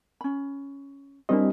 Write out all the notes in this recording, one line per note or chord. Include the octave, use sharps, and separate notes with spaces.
C#4 B5
G3 C4 D4 E4 G4 A#4 D#5